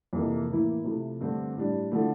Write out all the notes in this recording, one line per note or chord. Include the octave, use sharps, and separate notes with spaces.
F2 C3 E3 A#3
A2 E3 A#3 E4
C3 F3 A3 E4
G2 D3 A3 C4
A2 G3 D4
D3 F3 A3 E4